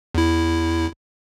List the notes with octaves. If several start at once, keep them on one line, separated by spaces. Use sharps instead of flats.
E2 E4